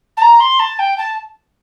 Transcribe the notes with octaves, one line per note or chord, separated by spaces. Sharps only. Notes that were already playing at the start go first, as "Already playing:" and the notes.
A5
A#5
C6
A5
G5
A5